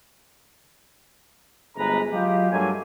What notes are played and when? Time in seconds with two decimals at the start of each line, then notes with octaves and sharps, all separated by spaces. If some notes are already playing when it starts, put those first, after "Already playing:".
1.77 G1 D2 G#3 B4 A#5
2.12 F#3 G#3 F4 G4
2.52 G2 F#3 A3 A#3 G#5